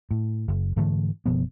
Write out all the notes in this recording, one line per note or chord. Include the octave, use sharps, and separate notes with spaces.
A2
F#1
G#2 D3 E3 A3
F#1 B2 F3 B3